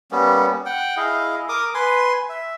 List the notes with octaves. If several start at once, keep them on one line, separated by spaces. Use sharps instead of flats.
G3 A#3 B3 C#4
F#5 G5
E4 G#4 D#5 F5
A#4 D6 D#6
B4 G#5 C6
E5